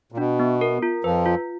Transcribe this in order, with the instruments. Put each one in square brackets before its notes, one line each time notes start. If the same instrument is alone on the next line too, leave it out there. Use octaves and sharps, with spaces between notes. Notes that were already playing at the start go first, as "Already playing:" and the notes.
[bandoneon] A#2
[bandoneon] B2 [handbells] D4
[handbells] B3
A#4
F4
[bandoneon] F2 F3 [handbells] B4
[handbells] F4